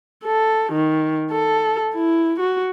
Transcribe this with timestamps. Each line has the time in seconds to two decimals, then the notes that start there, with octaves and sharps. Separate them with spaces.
0.25 A4
0.73 D#3
1.31 A4
1.94 E4
2.40 F#4